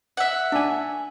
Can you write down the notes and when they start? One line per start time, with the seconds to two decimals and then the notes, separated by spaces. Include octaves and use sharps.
0.17 E5 F#5
0.52 D4 G#5